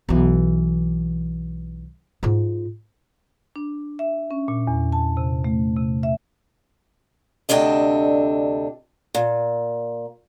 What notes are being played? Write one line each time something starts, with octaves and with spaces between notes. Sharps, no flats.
B1 E3
G#2 F4
D4
E5
C#4
A#2
E2
A5
C3
A3
C3
E5
D2 C3 D4 A4 D#5
A#2